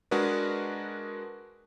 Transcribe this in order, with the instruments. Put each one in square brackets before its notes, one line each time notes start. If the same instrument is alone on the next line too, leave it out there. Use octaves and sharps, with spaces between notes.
[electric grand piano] G#3 D4 F#4 G#4 A#4 B4